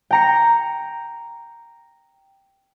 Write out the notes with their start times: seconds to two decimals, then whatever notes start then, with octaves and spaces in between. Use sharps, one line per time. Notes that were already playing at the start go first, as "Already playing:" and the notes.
0.11 G5 A#5 C#7